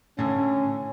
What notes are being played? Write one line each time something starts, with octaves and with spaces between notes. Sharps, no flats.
A2 D3 C#4